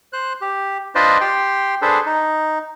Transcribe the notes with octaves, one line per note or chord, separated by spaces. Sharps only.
C5 F#6
G4
D4 F4 B4 C5 D5 D#5
G4 G5 C6
D4 G#4 A4 B4 C5
D#4